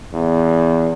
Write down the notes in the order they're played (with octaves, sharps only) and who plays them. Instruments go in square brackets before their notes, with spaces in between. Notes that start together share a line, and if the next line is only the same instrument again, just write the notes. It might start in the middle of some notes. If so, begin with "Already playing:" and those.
[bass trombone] E2